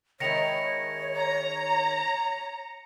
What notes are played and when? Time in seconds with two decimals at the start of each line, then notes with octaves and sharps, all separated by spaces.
0.20 D#3 G#3 E4 C#5 A#6 C#7 F7
1.16 A#5